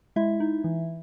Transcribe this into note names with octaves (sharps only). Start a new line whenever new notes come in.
G#3 E4 E5
D#4
E3